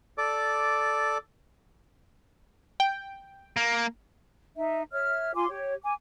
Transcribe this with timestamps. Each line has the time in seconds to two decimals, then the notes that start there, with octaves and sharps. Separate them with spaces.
0.18 A4 D5 D6
2.80 G5
3.57 A#3
4.57 D#4 E5
4.92 C#5 E5 F6
5.35 F4 G#5 C6 D6
5.49 G4 C#5
5.82 G#5 D6